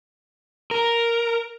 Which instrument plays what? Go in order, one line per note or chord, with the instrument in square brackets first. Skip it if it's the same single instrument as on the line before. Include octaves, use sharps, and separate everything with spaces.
[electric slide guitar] A#4